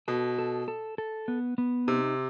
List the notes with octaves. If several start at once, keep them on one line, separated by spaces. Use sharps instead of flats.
B2 A4
A4
A4
A4
B3
B3
C3 D#4